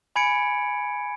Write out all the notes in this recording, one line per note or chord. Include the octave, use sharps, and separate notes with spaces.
G#5 B5 G#6 C#7 D7